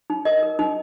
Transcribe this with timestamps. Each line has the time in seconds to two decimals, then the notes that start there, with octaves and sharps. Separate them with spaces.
0.10 D#4
0.25 A#4 D#5
0.43 A#4
0.59 D#4